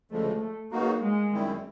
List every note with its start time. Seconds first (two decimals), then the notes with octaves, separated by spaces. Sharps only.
0.11 D2 C#3 F3 G#3 A3
0.41 A3
0.72 C#3 F#3 A#3 B3 D#4 F#4
1.01 G#3
1.31 F#2 D#3 G3 C4 E4